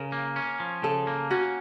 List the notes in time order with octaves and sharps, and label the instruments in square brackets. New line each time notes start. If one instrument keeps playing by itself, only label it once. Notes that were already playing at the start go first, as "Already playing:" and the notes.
Already playing: [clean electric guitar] C#3 [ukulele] A#4
[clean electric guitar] A#3
C#4
F3
[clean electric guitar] C#3 [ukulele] A4
[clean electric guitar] A#3
[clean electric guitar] C#4 [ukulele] F#4